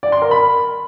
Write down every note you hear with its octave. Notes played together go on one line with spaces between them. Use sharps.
D5
C6
A#4
B5